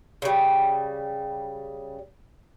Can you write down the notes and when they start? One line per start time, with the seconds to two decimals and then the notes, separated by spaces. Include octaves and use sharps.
0.22 C#3 G3